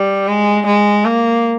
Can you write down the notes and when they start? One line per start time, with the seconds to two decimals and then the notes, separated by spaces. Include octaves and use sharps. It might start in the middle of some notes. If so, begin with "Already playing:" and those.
Already playing: G3
0.28 G#3
0.66 G#3
1.05 A#3